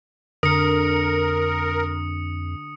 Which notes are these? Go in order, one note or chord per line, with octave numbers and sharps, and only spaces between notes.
F2 D3 A#4 D#6 C#7